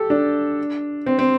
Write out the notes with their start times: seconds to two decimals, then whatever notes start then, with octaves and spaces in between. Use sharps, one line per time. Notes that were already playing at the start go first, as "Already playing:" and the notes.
Already playing: G4 A4
0.10 D4
1.06 C4
1.19 C4